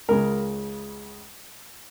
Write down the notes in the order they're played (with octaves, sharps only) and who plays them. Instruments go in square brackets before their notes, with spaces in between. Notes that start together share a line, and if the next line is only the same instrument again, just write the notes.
[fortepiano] C#2 C#3 G#3 A#4